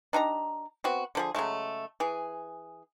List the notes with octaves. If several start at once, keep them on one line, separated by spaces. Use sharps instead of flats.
D4 D#4 G4 A#5
B3 C4 F#4
D3 F3 G#4
C#3 F#3 G#3 A3
E3 G#4